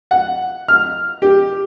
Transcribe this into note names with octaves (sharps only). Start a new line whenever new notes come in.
F#5
F6
G4